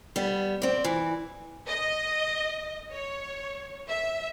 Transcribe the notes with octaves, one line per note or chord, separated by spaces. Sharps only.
G3 B3
C4 D5
E3
D#5
C#5
E5